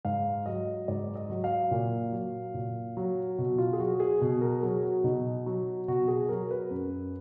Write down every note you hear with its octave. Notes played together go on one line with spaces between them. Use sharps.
G#2 F5
F#3 D#5
G#2 D5
D#5
F#3
F5
A#2
F#3
A#2
F#3
B2 F#4
F4
G#4
F#3 F#4
G#4
B2
A#4
F#3 G#4
F#4
B2 D#4
F#3
B2 F#4
G#4
F#3 A#4
B4
F#2